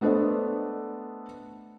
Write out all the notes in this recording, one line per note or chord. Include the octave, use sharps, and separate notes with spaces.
A3 B3 D4 A4 C5 D#5